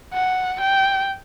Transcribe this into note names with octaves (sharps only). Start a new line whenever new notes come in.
F#5
G5